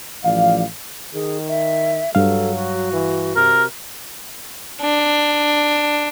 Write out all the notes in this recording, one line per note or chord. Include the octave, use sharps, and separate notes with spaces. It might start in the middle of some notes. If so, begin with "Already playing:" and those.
A1 F3 D5 F5
D#3 G#4
E5
G2 F#3 A4 F5
F#4
E3
C3 A#4
D4